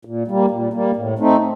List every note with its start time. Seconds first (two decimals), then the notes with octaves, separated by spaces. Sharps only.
0.05 A#2
0.28 G3 A#3
0.51 A#2
0.73 G3 A#3
0.96 A2
1.19 A3 C4 D#4